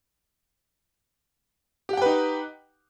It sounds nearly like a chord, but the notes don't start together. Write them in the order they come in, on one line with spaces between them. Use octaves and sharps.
G4 F#5 G5 B4 D#4